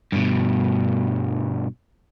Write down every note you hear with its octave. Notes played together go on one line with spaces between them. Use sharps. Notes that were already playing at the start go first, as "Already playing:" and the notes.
G2 B2